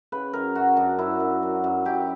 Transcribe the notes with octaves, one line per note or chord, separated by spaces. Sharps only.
C#3 B4
F#2 A#4
F#2 F#4
F#2 D4
F#2 E4
F#2
F#3
F#2
F#2 G4